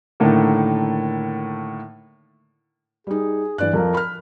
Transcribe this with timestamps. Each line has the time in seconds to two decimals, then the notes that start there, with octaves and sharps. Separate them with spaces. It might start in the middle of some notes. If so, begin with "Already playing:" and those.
0.20 A2 D3 D#3 A3 A#3
3.07 G3 D#4 G#4
3.58 G2 E3 D5 F#6
3.73 F2 F3 A#4
3.94 B5 F6